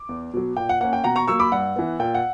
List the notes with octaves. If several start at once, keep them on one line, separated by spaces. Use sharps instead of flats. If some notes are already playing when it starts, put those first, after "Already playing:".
Already playing: D6
E2
B2 F#3
A#2 G5
F#5
A#3 C#4 F#5
G5
B2 F#5 A#5
A#5 C#6
F#3 A#3 C#6 E6
B5 D6
G2 F#5
E3 B3
A#2 G5
F#5